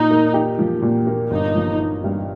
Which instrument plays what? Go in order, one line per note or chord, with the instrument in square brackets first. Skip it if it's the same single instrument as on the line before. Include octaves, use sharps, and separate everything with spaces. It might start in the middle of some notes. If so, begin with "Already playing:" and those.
Already playing: [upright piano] A#2 [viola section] D#4
[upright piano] A#3
G4
F3
A#2
A#3
[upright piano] G1 [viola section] D#4
[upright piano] F3
D#4
G2